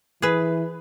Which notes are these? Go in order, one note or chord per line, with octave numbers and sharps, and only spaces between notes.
E3 G#4 B4